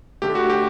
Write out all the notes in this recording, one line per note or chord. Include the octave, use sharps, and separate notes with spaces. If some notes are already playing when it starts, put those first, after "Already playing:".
D3 A3 G4
F#4
G4